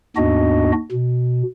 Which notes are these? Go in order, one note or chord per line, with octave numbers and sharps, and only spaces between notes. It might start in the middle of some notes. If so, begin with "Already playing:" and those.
D#2 G#2 B3 D4 F#4 D#5
B2